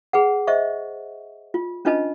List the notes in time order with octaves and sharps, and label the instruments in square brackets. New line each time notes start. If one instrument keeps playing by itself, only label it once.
[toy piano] G#4 B4 F#5
C5 D#5 E5 C#6
F4
C#4 D4 F4 B4 D#5 A5